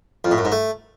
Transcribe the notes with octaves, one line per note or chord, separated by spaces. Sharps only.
F2
A2
F#2
G#2
A3